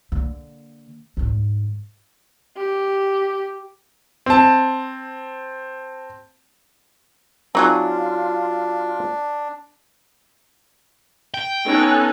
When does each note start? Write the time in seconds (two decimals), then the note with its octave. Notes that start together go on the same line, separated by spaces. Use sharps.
0.12 D3 A#3
1.17 D2 G#2
2.57 G4
4.26 C4 A5
7.55 F#3 C4 D4 D#4 F4 F#4 G#4 F#5
11.34 G5
11.65 B3 C#4 D#4 A4 G#5 F#6